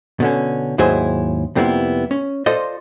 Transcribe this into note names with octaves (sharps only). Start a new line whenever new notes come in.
B2 D3 C#4
D#2 G#2 F#3 E4 G#4 C5
F2 C3 G3 A#3 B3 E4
C#4
F4 A4 C5 D5 D#5